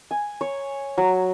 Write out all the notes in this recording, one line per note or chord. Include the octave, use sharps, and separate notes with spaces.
G#5
C#5
F#3